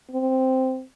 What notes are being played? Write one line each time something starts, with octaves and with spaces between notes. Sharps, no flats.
C4